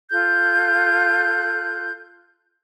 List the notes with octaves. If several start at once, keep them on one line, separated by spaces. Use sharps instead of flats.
F4 A4 F#6 G6